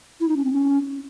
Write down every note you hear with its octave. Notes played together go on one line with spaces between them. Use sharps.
E4
D#4
C#4
C4
C#4